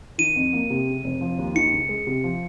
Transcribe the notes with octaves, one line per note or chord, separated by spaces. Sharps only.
D#3 D#7
F2
A#3
C3
C#3
F1
F3
D#2
D#3 C#7
C#2
G#3
C3
F3